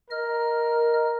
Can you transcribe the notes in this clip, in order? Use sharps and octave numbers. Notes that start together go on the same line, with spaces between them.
A#4 D#5 F6